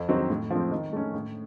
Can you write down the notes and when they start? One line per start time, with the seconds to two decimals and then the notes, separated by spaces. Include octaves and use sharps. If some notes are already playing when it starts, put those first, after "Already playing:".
Already playing: F2
0.09 D#3 F#3 C4 D#4
0.30 A2
0.50 F3 C4
0.71 D#3
0.93 A3 C#4
1.14 A2